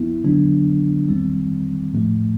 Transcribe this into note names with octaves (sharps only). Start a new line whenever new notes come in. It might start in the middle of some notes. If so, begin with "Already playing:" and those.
Already playing: F3 B3 E4
D3 F#3 B3 D4
D#3 G3 C4
A2 F3 A3